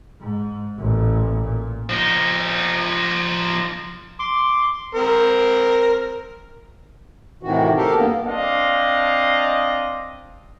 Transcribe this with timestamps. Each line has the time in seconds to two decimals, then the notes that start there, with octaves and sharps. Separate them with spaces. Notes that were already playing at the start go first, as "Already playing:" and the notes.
0.20 G#2
0.79 A1 A#2
1.40 A#2
1.89 F3 D#4
4.19 C6 D6
4.95 C4 A#4
7.43 A2 C3 D#3 E3 F#4
7.77 G4 A4 A#4 F5
7.95 G2 A#3 B3
8.26 C4 D4 D#5 F5